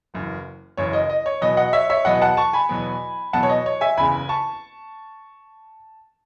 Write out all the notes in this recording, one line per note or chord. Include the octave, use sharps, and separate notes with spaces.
F#1 F#2 E3
F#1 F#2 E3 C#5
D#5
D#5
C#5
E2 B2 F#3 B3 D#5
D#5 F#5
C#5 E5
C#5 E5
E2 B2 F#3 B3 D#5 F#5
F#5 A5
A5 C#6
G#5 B5
E2 B2 F#3 B3
E2 B2 F#3 B3 F#5 A5
C#5
D#5
C#5
E5 G#5
F#1 E2 C#3 G#5 B5
A5 C#6